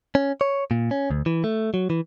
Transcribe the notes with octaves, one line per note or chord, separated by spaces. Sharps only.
C#4
C#5
A#2
C#4
D2
E3
A3
F#3
E3